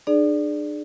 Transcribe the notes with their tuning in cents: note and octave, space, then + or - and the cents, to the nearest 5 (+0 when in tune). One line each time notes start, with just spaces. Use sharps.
D4 +40 G#4 +10 D5 +0